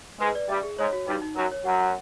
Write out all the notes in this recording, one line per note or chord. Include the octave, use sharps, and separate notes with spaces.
G#2 G#3 B4
D5
G2 G3 E5
G#4
G#2 G#3 C#5
F#4
G2 G3 D#4
D#4
F#2 F#3 A#4
C#5
F#2 F#3 F#5
F#5